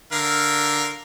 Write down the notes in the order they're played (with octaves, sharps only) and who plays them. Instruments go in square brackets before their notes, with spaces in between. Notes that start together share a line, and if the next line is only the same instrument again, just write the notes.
[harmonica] D3 A#4 F5